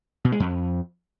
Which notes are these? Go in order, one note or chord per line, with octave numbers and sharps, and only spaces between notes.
B2
G#3
F2